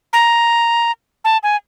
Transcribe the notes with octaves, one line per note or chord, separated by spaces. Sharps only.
A#5
A5
G#5